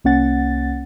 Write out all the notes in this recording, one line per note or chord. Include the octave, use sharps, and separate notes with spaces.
C2 A#3 C#4 F#5 A6